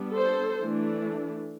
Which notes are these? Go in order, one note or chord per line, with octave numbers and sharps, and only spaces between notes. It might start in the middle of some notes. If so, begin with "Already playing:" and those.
Already playing: G3 B3 D4
A4 C5
E3 A3 D4